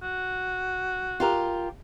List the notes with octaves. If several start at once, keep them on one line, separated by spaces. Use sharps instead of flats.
F#4
F4 G4 A#4